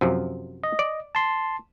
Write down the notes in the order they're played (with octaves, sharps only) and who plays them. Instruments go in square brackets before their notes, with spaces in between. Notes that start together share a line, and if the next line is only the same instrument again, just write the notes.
[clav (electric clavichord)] F#2 C3 F3
[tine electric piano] D#5
[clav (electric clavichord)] D5
[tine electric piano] A5 C6